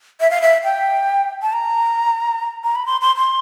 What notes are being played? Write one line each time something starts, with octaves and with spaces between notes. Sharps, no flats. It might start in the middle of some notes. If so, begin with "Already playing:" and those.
E5
F5
E5
G5
A5
A#5
A#5
B5
C6
C6
C6